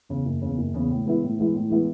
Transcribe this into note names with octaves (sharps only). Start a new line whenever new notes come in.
E2 C#3
F#1
E2 C#3
F#1
E2 C#3
A2
E3 G#3 B3 E4
A2
E3 G#3 B3 E4
A2
E3 G#3 B3 E4